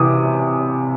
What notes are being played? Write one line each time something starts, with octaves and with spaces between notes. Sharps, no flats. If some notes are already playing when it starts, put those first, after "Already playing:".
Already playing: C3 E3 D6 D#6